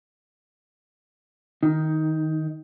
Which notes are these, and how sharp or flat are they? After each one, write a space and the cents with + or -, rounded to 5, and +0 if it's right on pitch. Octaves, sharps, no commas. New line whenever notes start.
D#3 +5 D#4 +15